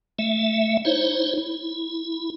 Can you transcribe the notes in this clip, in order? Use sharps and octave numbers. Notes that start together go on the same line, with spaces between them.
A3 E5
D#4 E4 C5 C#5
E4